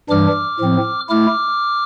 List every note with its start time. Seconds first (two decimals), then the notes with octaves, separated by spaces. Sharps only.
0.09 G2 E3 G3 D4 D6 F6
0.60 A2 F3 C4
1.09 A3 E4 D6 F6